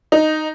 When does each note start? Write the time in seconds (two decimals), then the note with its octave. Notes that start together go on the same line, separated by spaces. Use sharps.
0.12 D#4